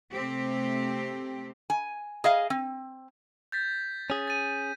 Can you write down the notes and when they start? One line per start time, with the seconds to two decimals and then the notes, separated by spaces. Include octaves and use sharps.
0.12 C3 A3 C4 G4
1.70 G#5
2.24 G#4 D#5 F5
2.50 C4
3.52 G6 A6 B6
4.10 C#4 G#4
4.28 A6 D#7